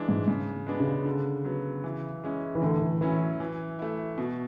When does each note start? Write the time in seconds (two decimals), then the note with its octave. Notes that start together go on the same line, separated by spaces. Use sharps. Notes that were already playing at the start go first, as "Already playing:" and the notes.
Already playing: E3 G#3 D4
0.09 G#2
0.27 G#2 C#3
0.67 G#3 B3 D4
0.80 C#3
1.06 D3
1.44 F#3 B3
1.84 E3
2.24 G#3 C#4 E4
2.55 E3
2.62 A2 D3
2.82 E3
3.01 E3 F#3 C#4 E4
3.40 E3
3.79 A3 E4
4.18 B2